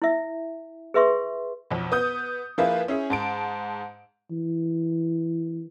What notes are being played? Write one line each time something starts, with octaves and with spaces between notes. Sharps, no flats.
E4 E5
G#4 B4 E5 C6 C#6
B1 F2
B3 D#6 G6
F3 A#3 E4 F4 G#4 B4
C#4 E4 G#4
G#2 A5 D7
E3